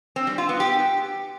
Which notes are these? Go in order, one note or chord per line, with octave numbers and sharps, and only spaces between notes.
C4
G3
F4
B3
G4